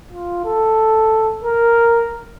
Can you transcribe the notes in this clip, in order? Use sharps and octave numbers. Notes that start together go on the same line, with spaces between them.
F4
A4
A#4